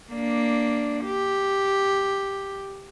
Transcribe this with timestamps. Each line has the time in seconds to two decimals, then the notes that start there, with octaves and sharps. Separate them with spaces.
0.12 A#3 D4
1.05 G4